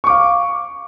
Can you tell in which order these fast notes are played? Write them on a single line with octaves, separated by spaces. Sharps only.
C#6 D6 F5